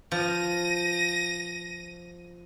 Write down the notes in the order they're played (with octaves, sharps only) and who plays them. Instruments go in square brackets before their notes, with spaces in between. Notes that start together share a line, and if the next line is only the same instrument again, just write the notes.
[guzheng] F3 [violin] A#6 D#7